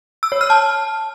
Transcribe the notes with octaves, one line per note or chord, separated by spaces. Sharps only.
E6
C#5
F6
A5